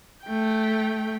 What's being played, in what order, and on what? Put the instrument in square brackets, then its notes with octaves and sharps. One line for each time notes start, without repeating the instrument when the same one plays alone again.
[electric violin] A3 G5